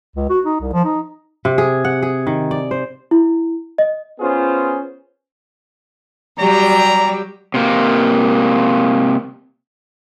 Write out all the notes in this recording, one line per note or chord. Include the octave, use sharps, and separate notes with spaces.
C#2
F#4
D#4
C2
F3
D#4
C3
G#4
F#5
G#4
D#3
D5
C5
E4
D#5
B3 C#4 F4 G#4 C5
F#3 G3 G4 D5 A#5
C3 A#3